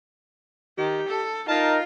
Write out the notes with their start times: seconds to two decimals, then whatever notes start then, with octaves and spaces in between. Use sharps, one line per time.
0.78 D#3 G4
1.08 A4
1.48 D#4 F4 A#4 A5